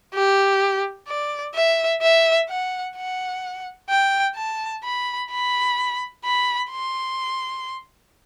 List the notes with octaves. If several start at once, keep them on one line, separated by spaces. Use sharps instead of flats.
G4
D5
E5
E5
F#5
F#5
G5
A5
B5
B5
B5
C6